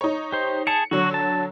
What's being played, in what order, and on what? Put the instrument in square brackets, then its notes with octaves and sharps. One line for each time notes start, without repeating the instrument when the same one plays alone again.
[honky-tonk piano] D#4 C#5
[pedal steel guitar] G4 C5
[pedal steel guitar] G#4 A5 [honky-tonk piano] C#7
[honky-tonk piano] D3 F#3 [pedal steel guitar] F#4
[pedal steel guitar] A5